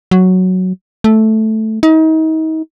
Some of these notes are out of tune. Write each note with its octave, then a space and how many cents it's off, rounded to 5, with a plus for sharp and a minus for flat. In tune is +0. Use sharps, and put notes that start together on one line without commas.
F#3 +0
A3 -5
D#4 +35